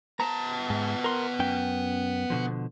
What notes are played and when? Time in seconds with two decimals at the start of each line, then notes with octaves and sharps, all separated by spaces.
0.20 B3 A5 A#5
0.70 G#2
1.04 A#4 C6
1.39 F#2 C#4 G5
2.30 B2 D3 F3